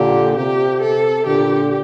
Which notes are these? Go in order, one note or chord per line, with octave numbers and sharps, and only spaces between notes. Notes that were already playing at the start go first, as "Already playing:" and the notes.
Already playing: A#2 D3 G4
C3 G4
A4
A#2 D3 G4